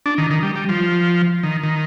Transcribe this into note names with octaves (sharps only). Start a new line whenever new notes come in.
D4
D#3
D#3
G3
G3
F3
D#3
D#3